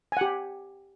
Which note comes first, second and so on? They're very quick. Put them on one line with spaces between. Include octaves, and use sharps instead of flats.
G#5 F#5 G4